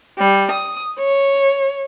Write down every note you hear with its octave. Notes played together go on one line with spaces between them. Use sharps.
G3
D#6
C#5